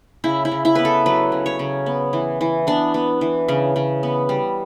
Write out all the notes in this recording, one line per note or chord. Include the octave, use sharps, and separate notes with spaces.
C#3 E4
E4
C#3
E4
B3 B4
A4
F#3 B4
C#3
C#5
C#3
B3
E3
E3
B3 D4
B3
E3
C#3
C#3
B3
G3